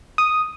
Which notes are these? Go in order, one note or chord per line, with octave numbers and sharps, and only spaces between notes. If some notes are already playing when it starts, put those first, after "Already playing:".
D#6